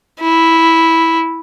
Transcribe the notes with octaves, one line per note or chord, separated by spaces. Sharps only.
E4